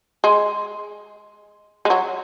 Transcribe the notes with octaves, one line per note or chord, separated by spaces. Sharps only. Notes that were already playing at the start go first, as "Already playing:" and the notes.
G#3
G#3
F#3